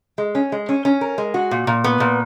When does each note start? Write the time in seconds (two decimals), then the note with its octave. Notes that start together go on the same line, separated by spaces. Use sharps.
0.18 G#3
0.35 C#4
0.52 G#3
0.69 C#4
0.85 C#4
1.01 A#4
1.18 G#3
1.34 F#4
1.51 A#2
1.67 A#2
1.84 B3
2.00 A#2